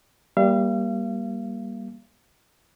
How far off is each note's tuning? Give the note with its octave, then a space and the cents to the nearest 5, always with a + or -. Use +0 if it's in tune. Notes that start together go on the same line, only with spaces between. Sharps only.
G3 +0 A#3 +25 F5 -40